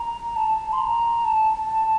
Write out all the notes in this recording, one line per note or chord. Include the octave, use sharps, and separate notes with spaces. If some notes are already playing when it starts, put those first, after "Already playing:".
Already playing: A#5
A5
C6
A#5
A5